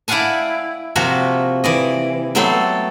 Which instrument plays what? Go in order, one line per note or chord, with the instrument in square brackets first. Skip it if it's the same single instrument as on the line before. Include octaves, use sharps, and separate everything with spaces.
[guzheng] E4 D5 F5 F#5 G#5 A5
C3 F3 A#3 F#4 E5
E3 D5 D#5
F#3 A3 B3 A4 G5 C6